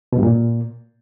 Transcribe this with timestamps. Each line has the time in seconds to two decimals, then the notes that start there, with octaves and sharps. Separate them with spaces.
0.13 B2
0.18 G2
0.23 A#2